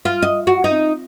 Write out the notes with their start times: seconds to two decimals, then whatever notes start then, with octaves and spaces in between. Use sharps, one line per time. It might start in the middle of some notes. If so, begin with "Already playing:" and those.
0.05 F4
0.22 D#5
0.47 F#4
0.64 D#4